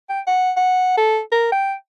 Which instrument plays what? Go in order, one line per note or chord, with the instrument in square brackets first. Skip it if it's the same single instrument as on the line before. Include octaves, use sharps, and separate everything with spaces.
[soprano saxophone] G5
F#5
F#5
A4
A#4
G5